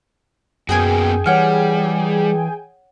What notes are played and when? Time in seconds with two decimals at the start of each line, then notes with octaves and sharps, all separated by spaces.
0.69 F#2 A#3 B3 F#4 G#4 G5 G#5
1.26 E3 G3 C#5 F#5 F6